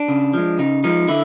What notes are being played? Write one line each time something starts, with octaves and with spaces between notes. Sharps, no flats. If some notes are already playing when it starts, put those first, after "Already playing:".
Already playing: D4
C#3
F3 G#3
C#3 D#4
F3 G#3 D#4
D3 E4